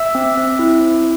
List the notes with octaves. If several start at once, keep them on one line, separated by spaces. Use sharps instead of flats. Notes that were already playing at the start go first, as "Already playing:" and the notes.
Already playing: E5 E6
C4
C4
E4
C4